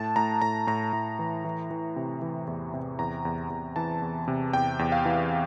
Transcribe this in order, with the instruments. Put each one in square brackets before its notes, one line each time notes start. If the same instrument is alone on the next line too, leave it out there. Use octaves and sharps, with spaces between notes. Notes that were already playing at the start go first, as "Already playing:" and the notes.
Already playing: [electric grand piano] A2 A5
A2 A#5
A2 A#5
A2 A#5
A2
E3
E3
E3
C3
E3
E2
C3
E2 A#5
E2
E2
E3 A5
E2
C3
E2 G5
E2
F5
E3